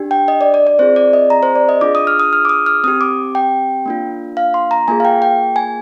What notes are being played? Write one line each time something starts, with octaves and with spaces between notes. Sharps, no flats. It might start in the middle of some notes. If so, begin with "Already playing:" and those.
Already playing: D4 G4
G5
D#5
D5
D5
D5
C4 F4 G#4 C5
D5
D#5
A#5
C5
D5
D#5
D4 F4 G#4 D6
D#6
F6
D#6
F6
D6
D#6
F6
C4 G4 D#6
D6
G5
A#3 D4 F4
F5
C6
A#5
A#3 F4 G#4 G#5
F5
G5
G5
G#5